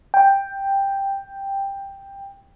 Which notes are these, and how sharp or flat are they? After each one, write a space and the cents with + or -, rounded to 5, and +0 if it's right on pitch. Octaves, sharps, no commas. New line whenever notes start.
G5 +10